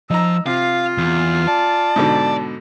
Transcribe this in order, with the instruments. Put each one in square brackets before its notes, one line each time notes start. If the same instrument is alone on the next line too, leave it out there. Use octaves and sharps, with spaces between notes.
[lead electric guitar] F3 [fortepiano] D#4 A#5 [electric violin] E6
[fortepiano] C3 [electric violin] F4 [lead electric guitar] F5
[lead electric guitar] E2
[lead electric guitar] D5 [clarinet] A5
[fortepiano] G#2 B2 D3